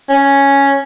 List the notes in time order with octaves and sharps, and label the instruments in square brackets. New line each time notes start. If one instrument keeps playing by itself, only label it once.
[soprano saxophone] C#4